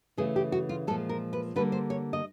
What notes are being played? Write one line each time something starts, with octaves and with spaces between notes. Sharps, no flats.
C#3 E3 A3 G#4
G4
F#4
F4
A#2 F3 G#3 A4
A#4
B4
D3 G3 A#3 B4
C5
C#5
D#5